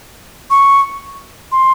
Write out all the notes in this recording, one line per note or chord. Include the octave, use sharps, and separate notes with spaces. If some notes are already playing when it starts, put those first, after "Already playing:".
C#6
C6